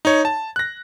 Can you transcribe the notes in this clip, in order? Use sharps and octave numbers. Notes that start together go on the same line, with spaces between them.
D#4 C#5
A5
F#6 A#6